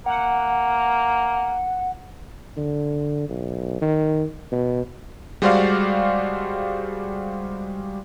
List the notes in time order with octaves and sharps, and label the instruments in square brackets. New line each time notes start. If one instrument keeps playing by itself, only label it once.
[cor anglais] A#3 [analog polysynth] F#5
[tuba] D3
B1
D#3
B2
[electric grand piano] G3 G#3 F#4 C5 D5 F5